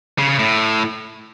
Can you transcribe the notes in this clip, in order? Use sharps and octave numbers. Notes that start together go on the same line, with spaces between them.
C#3
C#3
A2